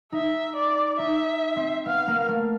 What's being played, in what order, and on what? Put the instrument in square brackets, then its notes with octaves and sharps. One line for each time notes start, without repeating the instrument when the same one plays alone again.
[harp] D#4 [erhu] E5
[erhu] D5
[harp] D#4 [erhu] E5
[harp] C4
[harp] B3 [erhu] F5
[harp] A#3
A3